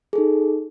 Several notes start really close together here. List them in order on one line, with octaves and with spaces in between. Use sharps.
G#4 A4 D#4